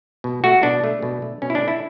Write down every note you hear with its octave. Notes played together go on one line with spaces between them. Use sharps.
B2
A3 F#4
B2 D4
A3
B2
A3
B2 C#4
E4
D4
A3
E4